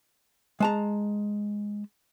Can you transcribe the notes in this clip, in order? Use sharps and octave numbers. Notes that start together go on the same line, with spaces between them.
G#3 A5 A#5